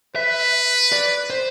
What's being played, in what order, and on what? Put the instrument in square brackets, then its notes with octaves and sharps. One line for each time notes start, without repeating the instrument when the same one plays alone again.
[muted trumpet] B4 [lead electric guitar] E5
[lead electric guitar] D5
C5